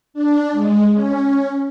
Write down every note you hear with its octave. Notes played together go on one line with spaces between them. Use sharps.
D4
G#3
C#4